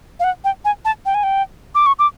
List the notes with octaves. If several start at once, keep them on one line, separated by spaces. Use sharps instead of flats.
F5
F#5
G5
G#5
A5
G5
G#5
G5
D6
C#6
D6